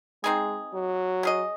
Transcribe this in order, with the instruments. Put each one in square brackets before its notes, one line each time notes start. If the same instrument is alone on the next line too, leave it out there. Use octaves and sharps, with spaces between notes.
[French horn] G#3 [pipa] C4 D#4 G#4
[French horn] F#3
[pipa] C#4 G#4 D#5